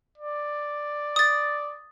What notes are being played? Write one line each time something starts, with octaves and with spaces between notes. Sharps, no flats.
D5
D#6 A6